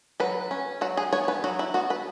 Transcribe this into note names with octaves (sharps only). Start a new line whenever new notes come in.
F#3 B4
C#4
F#3 F#4
G#4
B3 C#5
B4
F#3 F#4
E4
B3 F#4
B4